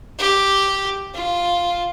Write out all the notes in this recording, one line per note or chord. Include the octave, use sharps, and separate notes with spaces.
G4
F4